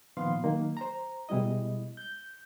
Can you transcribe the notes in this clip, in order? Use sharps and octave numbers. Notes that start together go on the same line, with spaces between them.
A#2 D#3 F3 B3 F5 C6
D#3 F#3 A#3
C5 A#5
B2 G3 G#3 E4 D#5
G6